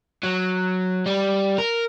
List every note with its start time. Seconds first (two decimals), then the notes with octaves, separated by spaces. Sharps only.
0.23 F#3
1.06 G3
1.58 A#4